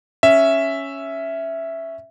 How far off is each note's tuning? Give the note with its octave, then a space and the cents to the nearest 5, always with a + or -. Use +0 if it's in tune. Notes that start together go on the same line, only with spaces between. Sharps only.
C#4 +0 E5 +0